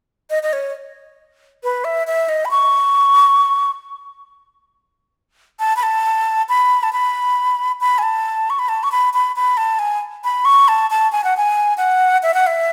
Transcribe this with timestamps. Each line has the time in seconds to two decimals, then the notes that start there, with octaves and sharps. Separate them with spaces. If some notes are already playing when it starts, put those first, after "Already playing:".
0.30 D#5
0.43 D#5
0.53 C#5
1.64 B4
1.84 E5
2.07 E5
2.29 D#5
2.45 B5
2.51 C#6
5.60 A5
5.76 B5
5.83 A5
6.49 B5
6.83 A5
6.93 B5
7.81 B5
7.98 G#5
8.03 A5
8.50 C#6
8.59 B5
8.69 A5
8.83 C#6
8.92 B5
9.14 B5
9.36 B5
9.57 A5
9.79 G#5
10.24 B5
10.45 C#6
10.68 A5
10.90 A5
11.12 G#5
11.24 F#5
11.37 G#5
11.78 F#5
12.23 E5
12.34 F#5
12.47 E5